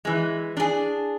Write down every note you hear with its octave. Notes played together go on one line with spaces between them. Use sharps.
E3 G#3
D4 G#4